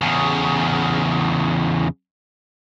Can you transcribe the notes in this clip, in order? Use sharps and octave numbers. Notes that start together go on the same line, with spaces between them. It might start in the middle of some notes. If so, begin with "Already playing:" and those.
E2 C#3